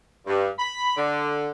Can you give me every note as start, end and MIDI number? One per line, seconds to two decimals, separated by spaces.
0.27 0.48 43
0.59 0.96 83
0.97 1.50 50